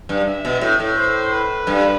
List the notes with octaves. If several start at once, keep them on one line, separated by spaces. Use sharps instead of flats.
G2
E5
B2
A2
A2
C5
B4
G2